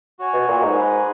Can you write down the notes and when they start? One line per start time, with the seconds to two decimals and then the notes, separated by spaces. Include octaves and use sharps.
0.19 F#4 C#5 G#5
0.33 B2
0.48 A#2
0.63 G#2
0.77 D#4 G#4 B4